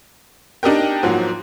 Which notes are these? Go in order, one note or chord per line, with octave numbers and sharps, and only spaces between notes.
D4 D#4 G4 A#4 G5
G#2 F3 F#3 A#3